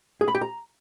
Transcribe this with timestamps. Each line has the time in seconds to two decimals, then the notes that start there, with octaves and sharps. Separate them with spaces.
0.21 G#4
0.28 B5
0.35 G4
0.41 A#5